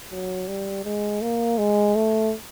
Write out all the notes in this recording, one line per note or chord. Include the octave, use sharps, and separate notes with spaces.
F#3
G3
G#3
A#3
G#3
A3